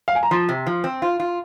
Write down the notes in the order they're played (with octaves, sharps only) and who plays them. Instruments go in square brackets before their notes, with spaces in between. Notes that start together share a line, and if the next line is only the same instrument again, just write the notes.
[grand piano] F5
G#5
A#5
[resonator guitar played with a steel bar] F3 [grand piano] C6
[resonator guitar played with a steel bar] C3
F3
C4
F4
F4